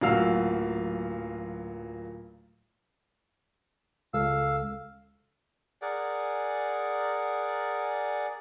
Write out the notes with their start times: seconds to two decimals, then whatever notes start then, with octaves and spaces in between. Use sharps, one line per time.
0.01 D1 A#2 F#3 F5 E6
4.14 C#2 A4 F5 E6
5.82 G#4 A#4 D5 F#5